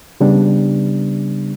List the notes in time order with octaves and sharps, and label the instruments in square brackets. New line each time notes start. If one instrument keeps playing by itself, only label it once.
[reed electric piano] C#3 G3 B3 D4